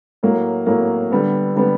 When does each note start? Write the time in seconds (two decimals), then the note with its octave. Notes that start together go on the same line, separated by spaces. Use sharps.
0.23 A2 F#3 A#3
0.66 A2 F#3 A#3
1.12 D3 G3 B3
1.55 D3 G3 B3